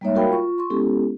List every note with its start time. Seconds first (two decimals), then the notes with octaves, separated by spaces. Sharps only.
0.01 G3 G#3 A#3 D#4 C#5 E5
0.15 F#4 A#4 F5 G5 B5
0.29 F4 C#6
0.58 C6 C#6
0.70 G#3 B3 C#4 E4 G4 A4